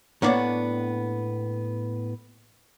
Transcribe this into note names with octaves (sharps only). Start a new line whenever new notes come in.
A2 A#3 B3 D4 C#5 D5